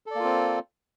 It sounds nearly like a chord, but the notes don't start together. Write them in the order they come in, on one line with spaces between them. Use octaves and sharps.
A4 D5 A#3 F4 C4